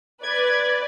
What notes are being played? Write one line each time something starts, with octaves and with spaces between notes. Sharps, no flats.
B4 D5 G#6